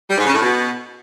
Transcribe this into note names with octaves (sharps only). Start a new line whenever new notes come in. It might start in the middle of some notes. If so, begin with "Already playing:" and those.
G3
G#2
C#3
A2
B2